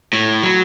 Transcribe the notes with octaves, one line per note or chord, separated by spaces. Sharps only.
A2
F#3